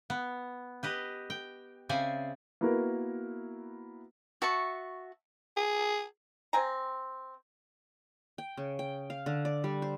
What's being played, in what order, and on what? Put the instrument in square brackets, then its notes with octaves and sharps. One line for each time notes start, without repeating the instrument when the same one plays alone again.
[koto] B3
G4 B4 D#5
G5
C#3 C4 D5 E5 G#5
[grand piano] A#3 B3 E4 F#4 A#4
[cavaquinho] F#4 E5 A5 C#6
[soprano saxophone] G#4
[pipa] C4 G5 G#5 A#5
[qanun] G5
C#3
G5
F5
D3
D5
G3
C5